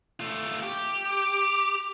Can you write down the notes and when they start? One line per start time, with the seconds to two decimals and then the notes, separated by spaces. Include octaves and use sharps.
0.20 A3 F4
0.63 G4
1.06 D6